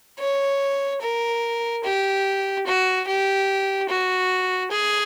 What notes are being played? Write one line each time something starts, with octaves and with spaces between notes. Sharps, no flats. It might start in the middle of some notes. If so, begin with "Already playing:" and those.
C#5
A#4
G4
F#4
G4
F#4
G#4